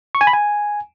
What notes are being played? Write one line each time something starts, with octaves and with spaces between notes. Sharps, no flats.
C#6
G#5
B5
G#5